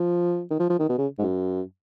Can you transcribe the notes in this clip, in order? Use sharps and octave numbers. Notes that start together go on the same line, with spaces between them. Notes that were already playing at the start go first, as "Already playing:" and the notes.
Already playing: F3
D#3
F3
F3
D#3
B2
C#3
G#2
F#2